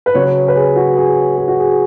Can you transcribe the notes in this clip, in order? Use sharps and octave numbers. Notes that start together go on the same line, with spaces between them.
B4
C#3 F#3 C#5
B4
G#4
F#4
G#4
G#4
F#4
G#4